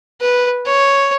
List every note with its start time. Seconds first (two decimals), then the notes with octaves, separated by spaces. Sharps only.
0.21 B4
0.66 C#5